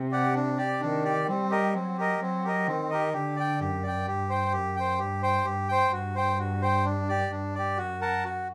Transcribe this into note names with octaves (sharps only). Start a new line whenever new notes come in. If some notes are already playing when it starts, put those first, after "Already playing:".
Already playing: C3
G4 D5 F#5
D4
G4 D5
D#3 D4
G4 D5
G3 C4
G4 A#4 D#5
F#3 C4
G4 A#4 D#5
F#3 C4
G4 A#4 D#5
D#3 C4
G4 A#4 D#5
D3 G4
D5 G5
F#2 G4
D5 G5
G2 G4
C5 G5
F#2 G4
C5 G5
G2 G4
C5 G5
G2 G4
C5 G5
G2 F#4
C5 G5
F#4
C5 G5
D4
G4 D5
G2 D4
G4 D5
F#2 F#4
A#4 F#5 A5
F#4